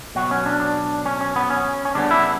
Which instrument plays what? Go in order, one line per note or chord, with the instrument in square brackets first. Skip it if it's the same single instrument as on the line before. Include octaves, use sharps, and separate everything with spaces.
[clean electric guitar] B2 F#3 B3 F#4
C#4
D4
D4
C#4
C#4
B3
C#4
C#4
C#3 G3 B3 D4
E4